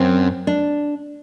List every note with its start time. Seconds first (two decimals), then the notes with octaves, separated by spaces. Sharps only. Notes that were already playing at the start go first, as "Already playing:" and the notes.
Already playing: F#2 C4
0.47 D4